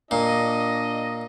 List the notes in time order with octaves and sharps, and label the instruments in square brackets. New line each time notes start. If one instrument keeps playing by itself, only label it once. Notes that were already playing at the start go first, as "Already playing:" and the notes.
[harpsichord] A#2 [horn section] D4 D#5